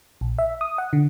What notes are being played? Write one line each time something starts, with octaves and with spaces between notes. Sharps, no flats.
A#1
E5
D#6
F#5
D3